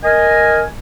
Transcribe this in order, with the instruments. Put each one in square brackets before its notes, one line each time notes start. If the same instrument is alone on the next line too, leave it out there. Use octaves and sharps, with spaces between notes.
[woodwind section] A#4 D#5 G#5